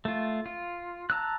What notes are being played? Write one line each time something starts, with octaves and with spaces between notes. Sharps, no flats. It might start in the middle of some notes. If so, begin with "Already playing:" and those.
A3 F4
F4
A5 A#5 E6 F#6